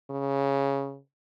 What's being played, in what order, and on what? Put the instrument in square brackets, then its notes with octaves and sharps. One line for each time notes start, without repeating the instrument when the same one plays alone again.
[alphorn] C#3